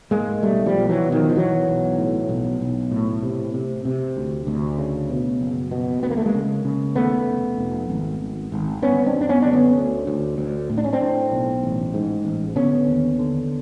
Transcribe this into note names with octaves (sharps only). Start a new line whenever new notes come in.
G#2 G#3 A#3
B1 G3 A3
F3 G3
B1
E3 F#3
B2
D#3 F3
F3
B1 E3 F#3
B1
A2
B1
B1
A2
C3
C3
C3
D2
D2
C#3
B2
F#1
B2
D2 B3
A#3
A3
G#3 A#3
C#3
C#3
D#2 A3 B3
F1
F1
G#1
G#1
G#1
G1 B3 C#4
C4 D4
F#2
D4
B3 C#4
D3 D4
B3 C#4
D2
D2
D2
A2
D4
C#4
C4 D4
A2
B1
A1
G#2
A1
D3 B3 C#4
D#2
D3